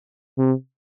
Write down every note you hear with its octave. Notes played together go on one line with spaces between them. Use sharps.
C3